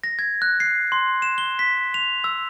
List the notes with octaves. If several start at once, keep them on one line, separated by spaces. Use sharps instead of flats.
A#6
G#6
F#6
C7
C6
E7
G7
B6
F7
E6